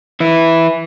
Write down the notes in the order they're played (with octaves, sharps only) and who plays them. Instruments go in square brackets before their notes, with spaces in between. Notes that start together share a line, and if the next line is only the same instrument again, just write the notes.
[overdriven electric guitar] E3 E4